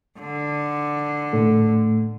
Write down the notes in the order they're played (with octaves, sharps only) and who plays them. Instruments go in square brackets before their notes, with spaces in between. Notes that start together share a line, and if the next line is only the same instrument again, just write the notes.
[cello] D3
[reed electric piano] A2 A3